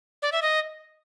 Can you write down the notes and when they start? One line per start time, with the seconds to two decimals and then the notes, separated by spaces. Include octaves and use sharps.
0.22 D5
0.32 E5
0.42 D#5